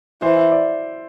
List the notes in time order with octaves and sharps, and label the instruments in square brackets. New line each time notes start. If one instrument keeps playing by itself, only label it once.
[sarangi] E3 [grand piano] C5
[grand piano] E5
D5